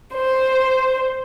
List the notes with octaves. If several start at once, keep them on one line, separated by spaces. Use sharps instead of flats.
C5